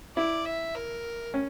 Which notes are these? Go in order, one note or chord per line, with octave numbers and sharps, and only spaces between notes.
E4 D5
E5
A#4
C#4